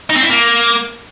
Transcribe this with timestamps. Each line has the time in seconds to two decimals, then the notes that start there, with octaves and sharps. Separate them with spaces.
0.10 D#4
0.17 C4
0.24 E4
0.30 A#3